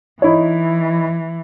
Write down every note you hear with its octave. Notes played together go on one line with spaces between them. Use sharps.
E3 D#4 E4 C#5